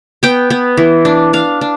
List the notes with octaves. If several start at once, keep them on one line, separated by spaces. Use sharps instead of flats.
B3 G5
B3
E3
D4
D4 F5
D4